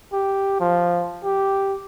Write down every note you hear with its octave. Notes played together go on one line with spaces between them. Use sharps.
G4
F3
G4